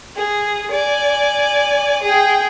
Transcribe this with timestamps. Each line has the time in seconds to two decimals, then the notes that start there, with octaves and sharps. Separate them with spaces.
0.16 G#4
0.71 D5 G#5
2.03 G#4 G5